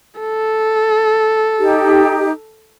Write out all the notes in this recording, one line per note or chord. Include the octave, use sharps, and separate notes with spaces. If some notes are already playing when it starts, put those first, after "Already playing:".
A4
D#4 G4